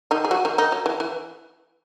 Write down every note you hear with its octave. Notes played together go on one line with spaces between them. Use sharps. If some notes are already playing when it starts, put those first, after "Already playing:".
D#3 D#4
G#4
F#3 F#4
D#3 D#4
D#3 D#4
F#3
E3
E3